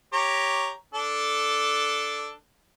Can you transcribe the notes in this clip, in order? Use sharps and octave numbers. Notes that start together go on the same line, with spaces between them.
G4 C#5 A#5
D4 A4